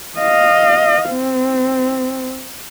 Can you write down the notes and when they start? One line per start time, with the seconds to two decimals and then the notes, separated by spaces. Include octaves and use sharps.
0.18 D#5 F5
1.10 C4